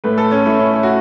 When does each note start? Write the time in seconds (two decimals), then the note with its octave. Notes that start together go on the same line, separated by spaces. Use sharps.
0.04 A2 A3 B4
0.18 A4
0.31 C#4
0.46 A2 A3 E4
0.59 C#4
0.73 E4
0.83 F#4